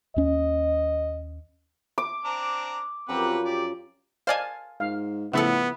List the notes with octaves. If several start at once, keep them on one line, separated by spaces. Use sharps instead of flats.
D#2 C#4 D#5
D6
C4 D4 A#5
F#2 F3 C4 G4 B4 F#5 A#5
G4 D5
C5 D5 D#5 F5 G#5 A5
G#2 F5
A2 C#3 F3 B3 A4 E5 F#5